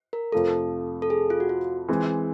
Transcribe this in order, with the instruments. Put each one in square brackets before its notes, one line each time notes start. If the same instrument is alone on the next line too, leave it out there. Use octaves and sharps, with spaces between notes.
[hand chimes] A#4
[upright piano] F2 C3 F3 A3 [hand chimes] A4
[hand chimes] A4
G#4
F4
F#4
F4
[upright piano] E3 G#3 C4